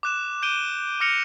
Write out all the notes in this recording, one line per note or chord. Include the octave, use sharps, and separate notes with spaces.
D6 F#6 E7
G6 D7 D#7 G7
D6 F6 A#6 C#7 F7 G7